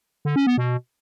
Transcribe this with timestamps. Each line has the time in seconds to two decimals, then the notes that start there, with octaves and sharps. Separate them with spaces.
0.25 D3
0.36 C#4
0.47 B3
0.57 B2